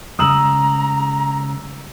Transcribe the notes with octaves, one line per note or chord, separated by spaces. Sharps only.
C#3 G3 G#3 A#5 D#6 E6 F#7